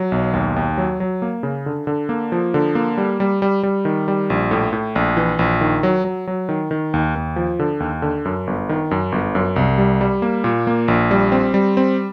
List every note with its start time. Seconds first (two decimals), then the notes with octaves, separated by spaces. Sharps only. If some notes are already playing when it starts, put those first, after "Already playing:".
Already playing: F#3
0.12 B1
0.34 D#2
0.56 D#2
0.78 F#3
1.00 F#3
1.22 A#3
1.43 C#3
1.66 D3
1.87 D3
2.09 A#3
2.32 F3
2.54 D3
2.75 A#3
2.97 G3
3.20 G3
3.42 G3
3.63 G3
3.85 D#3
4.08 G3
4.30 A#1
4.51 A2
4.73 A2
4.96 A#1
5.17 E3
5.39 A#1
5.61 D#3
5.83 F#3
6.05 F#3
6.27 F#3
6.49 D#3
6.71 D#3
6.94 D#2
7.16 D#2
7.36 F3
7.59 D3
7.80 D#2
8.02 D3
8.25 F#2
8.47 G1
8.69 D#3
8.91 F#2
9.12 G1
9.35 F#2
9.56 C2
9.78 G3
10.01 G3
10.22 A#3
10.44 A#2
10.67 A#3
10.88 A#1
11.11 G3
11.32 C4
11.54 G3
11.77 C4